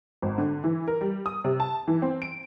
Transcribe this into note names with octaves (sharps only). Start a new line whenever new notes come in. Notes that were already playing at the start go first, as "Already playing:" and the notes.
G#1
D3
E3
A#4
G3
D#6
C3
A5
E3
C4
D7